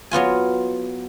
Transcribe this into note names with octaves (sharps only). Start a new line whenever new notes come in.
F#3 B3 F4 G#5